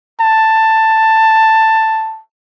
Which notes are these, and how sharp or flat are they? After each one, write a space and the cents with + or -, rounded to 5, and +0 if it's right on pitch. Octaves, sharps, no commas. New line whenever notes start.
A5 +10